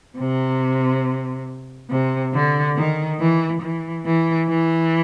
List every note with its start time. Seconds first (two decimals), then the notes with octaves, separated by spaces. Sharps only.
0.18 C3
1.90 C3
2.33 D3
2.76 D#3
3.20 E3
3.62 E3
4.05 E3
4.49 E3